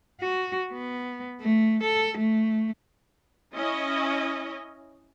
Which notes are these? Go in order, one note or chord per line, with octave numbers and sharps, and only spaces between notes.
F#4
B3
A3
A4
A3
C#4 E4 D#5